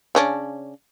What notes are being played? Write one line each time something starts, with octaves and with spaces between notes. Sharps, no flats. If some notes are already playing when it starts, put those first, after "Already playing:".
C#3 C#4 D4